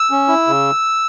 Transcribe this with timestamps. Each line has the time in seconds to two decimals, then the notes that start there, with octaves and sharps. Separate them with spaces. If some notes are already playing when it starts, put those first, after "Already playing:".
Already playing: E6
0.11 C#4
0.28 E4
0.47 C#3